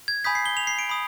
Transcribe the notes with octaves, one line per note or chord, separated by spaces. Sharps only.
G#6
G#5 B5 D#6 G6 B6
C7
G7
F7
C7
D7
B5 D#6